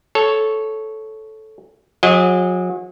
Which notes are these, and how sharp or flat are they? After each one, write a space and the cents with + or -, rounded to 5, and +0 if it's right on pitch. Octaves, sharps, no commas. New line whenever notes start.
A4 -10 C#5 +0
F#3 -40 G#4 -30 D#5 +5